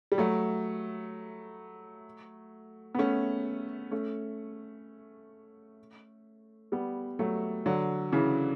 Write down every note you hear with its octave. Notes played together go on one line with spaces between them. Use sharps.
G3
F#3 A3
B3
A3 C#4
A3 C#4
G3 B3
F#3 A3
D3 F#3
C#3 E3